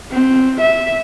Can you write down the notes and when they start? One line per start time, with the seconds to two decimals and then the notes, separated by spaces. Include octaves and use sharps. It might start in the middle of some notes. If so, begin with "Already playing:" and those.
0.11 C4
0.61 E5